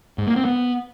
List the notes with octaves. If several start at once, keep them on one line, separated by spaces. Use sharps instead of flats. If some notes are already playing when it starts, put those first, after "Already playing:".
G#2
A#3
C4
B3